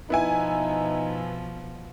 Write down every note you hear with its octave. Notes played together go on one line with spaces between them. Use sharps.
B2 F3 B3 D#4 E4 G#5